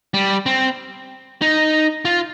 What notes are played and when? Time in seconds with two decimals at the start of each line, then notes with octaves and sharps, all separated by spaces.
0.14 G3
0.46 C4
1.42 D#4
2.05 F4